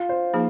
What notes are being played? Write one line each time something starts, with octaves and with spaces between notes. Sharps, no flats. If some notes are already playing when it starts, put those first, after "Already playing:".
Already playing: F4
C5
F3 A#3 D#4 G#4